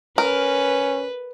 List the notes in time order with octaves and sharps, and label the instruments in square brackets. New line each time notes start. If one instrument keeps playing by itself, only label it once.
[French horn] C#4 [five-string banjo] A#4 [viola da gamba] B4